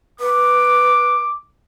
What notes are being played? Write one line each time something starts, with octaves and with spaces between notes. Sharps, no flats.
B4 D6